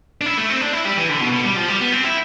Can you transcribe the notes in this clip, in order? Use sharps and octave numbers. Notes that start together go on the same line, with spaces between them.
D4
E4
A3
C4
D4
E4
G3
E3
D3
B2
B2
G3
F3
G3
B3
C4
E4